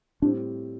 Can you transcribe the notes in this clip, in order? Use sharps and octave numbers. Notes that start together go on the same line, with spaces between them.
A2 G3 C4 D4